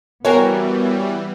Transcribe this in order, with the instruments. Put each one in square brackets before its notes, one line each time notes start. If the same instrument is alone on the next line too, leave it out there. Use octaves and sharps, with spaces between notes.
[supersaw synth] E3 G3 [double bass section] B3 [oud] F#4 G#4 A#4 [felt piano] C#5 G5